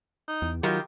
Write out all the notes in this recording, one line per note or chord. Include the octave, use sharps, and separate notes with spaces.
D#4
E2
D#3 F#3 F4 G4 A#4